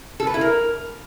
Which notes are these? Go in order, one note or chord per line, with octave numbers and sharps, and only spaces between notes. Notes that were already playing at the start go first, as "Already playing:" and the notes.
A4
B4
E4
A#4